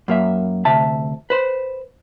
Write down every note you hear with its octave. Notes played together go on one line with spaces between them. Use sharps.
F#2 A#3 E5
D2 C3 E5 A5
B4 C5